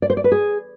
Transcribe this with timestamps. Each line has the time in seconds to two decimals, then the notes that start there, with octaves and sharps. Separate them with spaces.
0.02 D5
0.10 C5
0.17 D5
0.24 B4
0.32 G#4